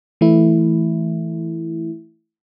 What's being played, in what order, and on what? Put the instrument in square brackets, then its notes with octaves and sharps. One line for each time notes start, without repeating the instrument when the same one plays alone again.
[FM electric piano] E3 A3 E4